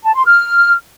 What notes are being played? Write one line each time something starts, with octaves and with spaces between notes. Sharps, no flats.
A5
C6
F6